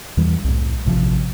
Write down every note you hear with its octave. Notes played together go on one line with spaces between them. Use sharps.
E2 E3 G3
C2 A2
A1 C3 D#3 F3